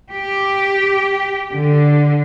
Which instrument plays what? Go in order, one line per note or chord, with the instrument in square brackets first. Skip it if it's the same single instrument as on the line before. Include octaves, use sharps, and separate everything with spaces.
[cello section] G4
D3